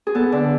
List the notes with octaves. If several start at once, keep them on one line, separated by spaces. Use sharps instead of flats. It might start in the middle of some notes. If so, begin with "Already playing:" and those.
G#4
B3 A4
D3